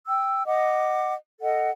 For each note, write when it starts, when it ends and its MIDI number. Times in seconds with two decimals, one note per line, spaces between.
0.07 0.45 79
0.07 0.45 88
0.46 1.14 75
0.46 1.14 78
0.46 1.14 86
1.41 1.70 69
1.41 1.70 75
1.41 1.70 78